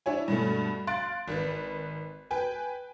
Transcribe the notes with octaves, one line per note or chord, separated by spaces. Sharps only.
D4 E4 C#5 G#5
G2 B2 A3
F5 C6 F#6 A6 D7
G#1 B4
B4 G5 G#5